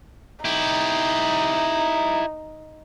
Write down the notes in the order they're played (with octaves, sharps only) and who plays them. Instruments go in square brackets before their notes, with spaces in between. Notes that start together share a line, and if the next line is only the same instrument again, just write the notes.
[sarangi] D#4 [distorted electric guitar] E4 G4